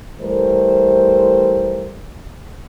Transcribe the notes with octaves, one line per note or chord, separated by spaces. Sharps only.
E3 G3 A3 A#4 C5